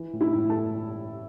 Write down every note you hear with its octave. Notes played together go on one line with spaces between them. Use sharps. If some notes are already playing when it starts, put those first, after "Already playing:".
Already playing: E3
A2
E4 E5
A2
A4 A5
E3